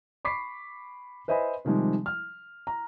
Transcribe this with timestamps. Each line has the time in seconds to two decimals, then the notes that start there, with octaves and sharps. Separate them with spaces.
0.25 B5 C#6 D6 B6 C7
1.28 B4 C5 D#5 E5 G#5 B5
1.65 C3 D#3 F3 G3 G#3
2.06 F6
2.67 A#5